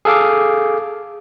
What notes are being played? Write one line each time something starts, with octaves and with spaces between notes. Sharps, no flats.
G#4 A4 F5 D6